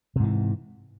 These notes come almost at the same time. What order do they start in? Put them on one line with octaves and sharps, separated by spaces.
C3 G#2 E3